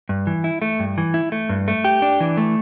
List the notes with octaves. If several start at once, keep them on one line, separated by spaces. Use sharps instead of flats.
G2
E3
E4
A3
G2
E3
E4
A3
G2
A3
G4
D4
E3
A3